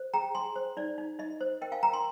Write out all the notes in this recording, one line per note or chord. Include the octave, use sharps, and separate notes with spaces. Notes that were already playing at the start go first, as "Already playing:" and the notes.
Already playing: C5
G#4 G5 A#5
G#4 G#5 C6
C5
D#4 D5
D#4
D#4 D#5
C5
A#4 D#5 G5
F5 G#5
A#4 G5 A#5
G#5 C6